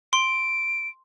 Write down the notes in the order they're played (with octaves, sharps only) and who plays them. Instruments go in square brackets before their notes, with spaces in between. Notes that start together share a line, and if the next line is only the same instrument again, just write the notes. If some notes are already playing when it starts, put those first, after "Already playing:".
[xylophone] C6 [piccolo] D7